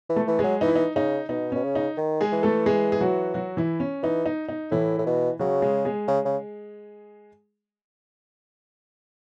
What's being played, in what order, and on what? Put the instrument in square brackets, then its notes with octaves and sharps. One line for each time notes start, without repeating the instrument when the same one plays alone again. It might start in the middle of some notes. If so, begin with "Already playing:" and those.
[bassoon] E3
[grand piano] A3 A4
[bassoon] E3
[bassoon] F#3 [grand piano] G#3 G#4
[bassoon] E3 [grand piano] D#4
[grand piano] E4
D#4
[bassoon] C#3 [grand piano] D#4
[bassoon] B2 [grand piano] D#4
[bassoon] B2 [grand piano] C#4
[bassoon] C#3
[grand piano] D#4
[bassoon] D#3
[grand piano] G#3 G#4
[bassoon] E3
[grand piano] A3 A4
G#3 G#4
G#4
F#3 F#4
F#3 F#4
E3 E4
C#4
[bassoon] E3 [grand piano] D#4
[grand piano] D#4
D#4
[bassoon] A2 [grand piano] E3 E4
[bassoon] A2
B2
[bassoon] C#3 [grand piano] F#3 F#4
[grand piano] G#3 G#4
G#3 G#4
[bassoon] C#3
C#3